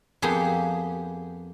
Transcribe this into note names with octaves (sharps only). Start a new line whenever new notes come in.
F2 A#3 B3 G4 G#4